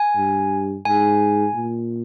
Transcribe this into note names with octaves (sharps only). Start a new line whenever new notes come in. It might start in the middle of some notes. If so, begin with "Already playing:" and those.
Already playing: G#5
G2
G#2 G#5
A#2